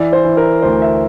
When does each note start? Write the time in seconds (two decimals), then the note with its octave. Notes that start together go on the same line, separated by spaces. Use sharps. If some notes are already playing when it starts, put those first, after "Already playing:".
Already playing: E3 D5
0.13 C5
0.25 E3
0.37 A#4
0.62 D2 C5
0.82 E5